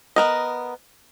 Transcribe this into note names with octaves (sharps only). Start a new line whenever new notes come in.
B3 A#4 D#5